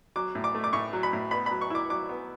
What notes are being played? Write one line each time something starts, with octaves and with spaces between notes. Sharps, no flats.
F#3 D6
A2
D6
A3
D6
A2 C#6
F#3
B5
A2
B3 B5
F#3 B5
C#6
E4 D6
F#3 D6
B3